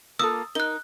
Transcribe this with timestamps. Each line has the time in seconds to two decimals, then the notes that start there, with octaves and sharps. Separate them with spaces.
0.19 A#3 F4 A4 D#6 E6
0.55 D#4 A#4 F#6 G7